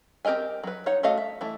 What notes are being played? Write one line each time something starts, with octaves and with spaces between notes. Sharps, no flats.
C4 G4 A#4 D#5 G#5
F#3 B4
D#4 C#5 F#5
A3 F#4 A4 D#5 F5
E5
E3 A3 E4